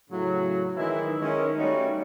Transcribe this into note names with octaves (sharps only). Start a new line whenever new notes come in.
A2 C#3 F#3
D#3 E3 G#3 E4
D#3 E3 G#3 C#4
G3 A3 C#4 D#4 F#4